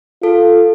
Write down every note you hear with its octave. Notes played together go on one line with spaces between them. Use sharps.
F4 A4